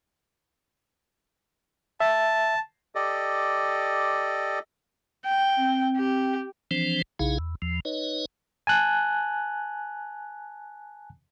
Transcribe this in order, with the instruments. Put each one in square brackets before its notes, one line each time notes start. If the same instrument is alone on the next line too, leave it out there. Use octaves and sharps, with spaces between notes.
[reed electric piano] E5 [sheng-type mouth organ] A5
[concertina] G4 A4 D5 D#5
[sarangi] G5
[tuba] C4
[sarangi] G4
[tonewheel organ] E3 F3 C4 D4 C5
B1 C#3 D#4 E4 G#4 F5
E2
E2 F3
D#4 B4 C#5 D#5
[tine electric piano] G#5 A5 F#6